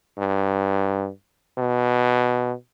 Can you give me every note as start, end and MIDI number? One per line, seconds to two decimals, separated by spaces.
0.18 1.09 43
1.58 2.53 47